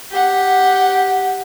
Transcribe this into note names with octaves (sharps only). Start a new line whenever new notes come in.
G4 F#5